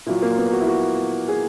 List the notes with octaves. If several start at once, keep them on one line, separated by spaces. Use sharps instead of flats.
A#2 F#3 E4
A#3
B3
F#4
E4
F#4
G#4